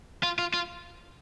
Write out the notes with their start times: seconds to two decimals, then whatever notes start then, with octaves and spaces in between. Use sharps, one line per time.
0.23 F4
0.39 F4
0.54 F4